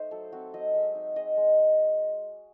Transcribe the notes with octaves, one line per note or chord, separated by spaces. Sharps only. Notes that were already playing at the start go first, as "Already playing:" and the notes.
Already playing: A3 D#4 C5
F#3 A4
C4 F#4
F#3 D#5
G#3 E5
D#4
G#3 D#5
G#3
G#3